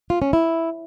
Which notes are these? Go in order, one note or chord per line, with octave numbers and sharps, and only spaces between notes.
F4
C#4
E4